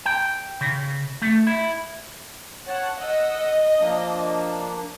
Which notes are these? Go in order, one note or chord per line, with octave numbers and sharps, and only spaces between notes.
G5
C#3
A3
E4
C#5 F#5 A5
D#5 F#5 E6
F3 A#3 D4